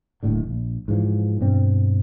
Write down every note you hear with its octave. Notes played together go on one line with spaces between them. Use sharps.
D1 D#2 A2 D3
A#1
G#2 E3 F3
G2 B2 C4